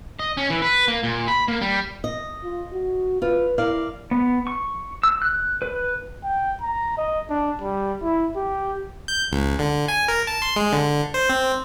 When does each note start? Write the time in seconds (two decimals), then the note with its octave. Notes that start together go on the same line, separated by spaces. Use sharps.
0.19 D#5
0.37 C#4
0.50 E3
0.62 B4
0.88 A#3
1.04 A#2
1.28 B5
1.48 A#3
1.61 G3
2.04 D#5
2.44 F4
2.73 F#4
3.22 F4 B4
3.58 E4 A#4 D5 F5
4.11 B3
4.47 C#6
5.03 E6
5.22 F#6
5.62 B4
6.24 G5
6.61 A#5
6.97 D#5
7.29 D4
7.61 G3
8.02 E4
8.36 G4
9.08 G6
9.32 C#2
9.59 D3
9.88 G#5
10.08 A#4
10.27 A5
10.42 C6
10.56 G#3
10.73 D3
11.14 C5
11.30 C4